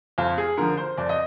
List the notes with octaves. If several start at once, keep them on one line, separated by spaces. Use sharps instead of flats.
F2 F4
G#4
D3 F3 A#4
C5
F2 D5
D#5